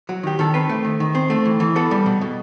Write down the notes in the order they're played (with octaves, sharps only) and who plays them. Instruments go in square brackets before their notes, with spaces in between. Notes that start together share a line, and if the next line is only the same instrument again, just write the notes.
[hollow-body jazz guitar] F#3
D#3 G4
D#3 A4
C4 B4
A3
D#3
D#3
C4
A3
E3
E3
B3 A4
G3
B2
B2